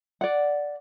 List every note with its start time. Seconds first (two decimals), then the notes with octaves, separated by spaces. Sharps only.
0.21 D5 F#5